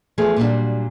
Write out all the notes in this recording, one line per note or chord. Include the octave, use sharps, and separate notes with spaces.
E2 F3 A3 G#4
A#2 F#3 G3 D4